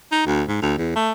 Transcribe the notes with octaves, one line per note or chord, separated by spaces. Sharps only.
D#4
D2
G#2
D2
E2
A3